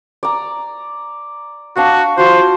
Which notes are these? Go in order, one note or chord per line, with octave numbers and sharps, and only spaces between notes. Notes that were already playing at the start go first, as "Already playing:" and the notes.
D5 A#5
D4 F#4 F5 E6
F4 F#4 C5